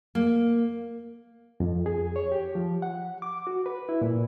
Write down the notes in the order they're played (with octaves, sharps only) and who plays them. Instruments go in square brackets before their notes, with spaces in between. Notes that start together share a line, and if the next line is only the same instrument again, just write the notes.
[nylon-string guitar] A#3
[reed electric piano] F2
G#4
C#5
G4
F3
F#5
D6
F#4
B4
E4
A#2